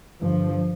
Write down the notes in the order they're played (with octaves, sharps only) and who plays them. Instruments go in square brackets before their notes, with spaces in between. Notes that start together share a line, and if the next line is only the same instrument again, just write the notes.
[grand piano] G2 D3 [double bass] F3